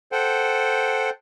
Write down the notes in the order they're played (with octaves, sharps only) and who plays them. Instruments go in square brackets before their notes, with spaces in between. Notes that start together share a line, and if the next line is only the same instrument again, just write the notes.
[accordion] A4 C5 F#5 G5